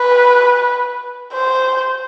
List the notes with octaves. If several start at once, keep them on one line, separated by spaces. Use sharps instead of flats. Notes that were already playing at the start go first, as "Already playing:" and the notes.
Already playing: B4
C5